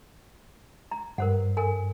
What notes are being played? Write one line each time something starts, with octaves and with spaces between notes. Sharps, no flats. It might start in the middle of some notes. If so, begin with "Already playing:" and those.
A#5
G2 A#4 C5 F#5
A4 A#4 G#5